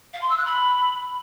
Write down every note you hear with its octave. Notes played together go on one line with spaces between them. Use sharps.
F5
C6
E6
F#6
B5